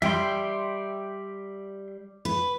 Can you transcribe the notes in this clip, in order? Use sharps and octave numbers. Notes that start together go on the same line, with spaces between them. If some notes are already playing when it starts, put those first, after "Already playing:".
G3 E5 G5 C6
B4